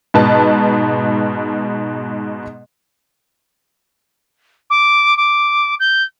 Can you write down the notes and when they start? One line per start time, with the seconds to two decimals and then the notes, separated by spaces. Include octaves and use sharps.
0.14 G#2 B2 B4 A5
4.70 D6
5.17 D6
5.80 G6